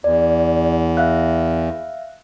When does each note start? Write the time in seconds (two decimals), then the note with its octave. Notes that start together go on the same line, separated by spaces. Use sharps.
0.04 E2 D5
0.97 E5 F5 F#6